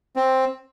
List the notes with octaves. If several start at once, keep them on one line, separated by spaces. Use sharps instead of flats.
C4